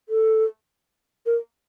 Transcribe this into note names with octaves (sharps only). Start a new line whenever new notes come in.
A4
A#4